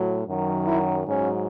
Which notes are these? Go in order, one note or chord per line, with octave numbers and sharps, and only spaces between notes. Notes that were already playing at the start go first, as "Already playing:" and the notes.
Already playing: A2 F#3
F#2 D#3 F#3
E4
G#2 F#3 C#4